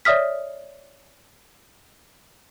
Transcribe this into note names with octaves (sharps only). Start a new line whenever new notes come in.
C#5 D5 E5 D#6 F6 B6